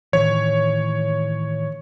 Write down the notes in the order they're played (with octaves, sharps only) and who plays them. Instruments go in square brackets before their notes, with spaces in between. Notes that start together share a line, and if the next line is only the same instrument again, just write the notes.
[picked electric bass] A2 D#3 E3 [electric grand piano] C#5